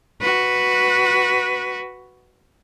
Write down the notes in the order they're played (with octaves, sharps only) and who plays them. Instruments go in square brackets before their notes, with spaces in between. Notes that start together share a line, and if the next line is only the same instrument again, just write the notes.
[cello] F#4 B4